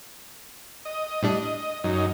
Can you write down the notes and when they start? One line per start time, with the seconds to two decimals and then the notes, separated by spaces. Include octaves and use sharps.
0.85 D#5
1.23 A2 G3 D4
1.84 F#2 D#4